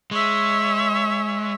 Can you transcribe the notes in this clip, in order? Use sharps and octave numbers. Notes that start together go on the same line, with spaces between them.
G#3 C#5 E5